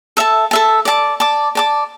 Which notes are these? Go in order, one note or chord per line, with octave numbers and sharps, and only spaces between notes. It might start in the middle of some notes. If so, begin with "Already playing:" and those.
A4 E5 A5
A4 E5 A5
D5 A5 D6
D5 A5 D6
D5 A5 D6